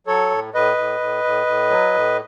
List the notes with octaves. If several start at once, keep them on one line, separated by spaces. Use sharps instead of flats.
F#3 A4 C#5
A2
A2 B4 D#5
A2
A2
A2
A2
F#3
A2